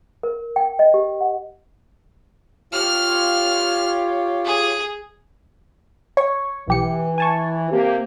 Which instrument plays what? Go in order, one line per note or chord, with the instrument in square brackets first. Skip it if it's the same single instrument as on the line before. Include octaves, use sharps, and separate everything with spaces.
[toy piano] A#4
G5
D#5
G4
F#5
[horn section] F4 G4 C#5 [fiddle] F6
[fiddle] G#4
[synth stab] C#5 C#6
[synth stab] B1 G4 C#7 [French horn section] E3
[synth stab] G#5 A5 C#6
[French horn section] C3 A#3 G4